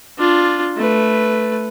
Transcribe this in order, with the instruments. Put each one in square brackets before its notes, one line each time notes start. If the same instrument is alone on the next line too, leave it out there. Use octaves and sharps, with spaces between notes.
[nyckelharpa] D4 F4
A3 B4